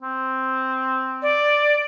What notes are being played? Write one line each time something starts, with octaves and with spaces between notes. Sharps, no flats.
C4
D5